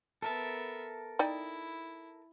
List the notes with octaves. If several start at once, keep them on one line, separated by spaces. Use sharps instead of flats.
B3 A4 A#4 E5 A5
D#4 E4 D5 G5